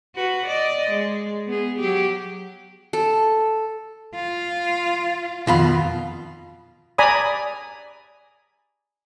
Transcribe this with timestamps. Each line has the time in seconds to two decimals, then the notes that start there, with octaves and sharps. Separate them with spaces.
0.16 F#4 B4
0.46 D5 D#5
0.90 G#3
1.47 B3 G#4
1.79 F#3 G4
2.93 A4
4.15 F4
5.47 F2 B2 D#3 F4 B5
6.98 D5 G#5 A#5 B5 D#6